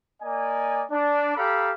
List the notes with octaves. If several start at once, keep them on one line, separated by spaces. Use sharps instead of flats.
A#3 D5 D#5 G#5
D4
G4 A4 F5 A#5 B5